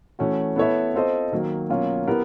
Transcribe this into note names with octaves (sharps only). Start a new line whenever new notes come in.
E3 A3 C#4 F#4
B3 E4 A4 C#5 E5
C4 F4 A4 C5 D#5
D#3 F#3 A#3
B2 F#3 A#3 C#4 F4
B3 E4 G4 A#4